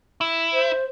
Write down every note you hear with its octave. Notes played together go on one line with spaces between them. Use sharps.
E4
C5